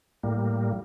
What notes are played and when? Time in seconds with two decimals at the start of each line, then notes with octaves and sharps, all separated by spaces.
0.23 A2 G3 A#3